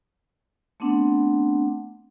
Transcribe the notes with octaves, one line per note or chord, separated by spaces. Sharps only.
A3 B3 C4 D4 F#5